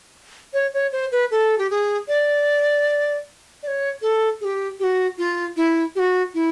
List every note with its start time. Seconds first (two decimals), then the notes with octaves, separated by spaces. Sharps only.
0.54 C#5
0.74 C#5
0.92 C5
1.12 B4
1.31 A4
1.58 G4
1.70 G#4
2.08 D5
3.63 D5
3.67 C#5
4.02 A4
4.41 G#4
4.45 G4
4.80 G4
4.84 F#4
5.18 F4
5.57 E4
5.96 G4
5.99 F#4
6.34 E4